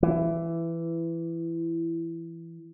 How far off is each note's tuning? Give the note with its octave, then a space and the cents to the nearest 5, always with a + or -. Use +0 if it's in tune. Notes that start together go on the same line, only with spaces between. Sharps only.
E3 +15